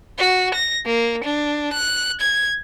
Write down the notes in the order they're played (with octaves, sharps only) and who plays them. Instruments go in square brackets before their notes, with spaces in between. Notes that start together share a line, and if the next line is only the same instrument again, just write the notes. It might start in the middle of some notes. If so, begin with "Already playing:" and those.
[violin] F#4
A#6
A#3
D4
F#6
G#6